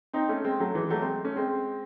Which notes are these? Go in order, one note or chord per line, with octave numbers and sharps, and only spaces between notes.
C4 D#4
A3 C#4
G#3 C4
F#3 A3
E3 G#3
F#3 A3
G#3 C4
A3 C#4
G#3 C4